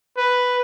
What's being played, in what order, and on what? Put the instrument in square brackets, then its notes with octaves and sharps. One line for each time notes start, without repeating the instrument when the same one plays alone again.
[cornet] B4